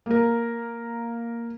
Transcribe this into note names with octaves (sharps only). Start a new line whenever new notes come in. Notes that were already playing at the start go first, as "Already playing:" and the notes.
A#3 A#4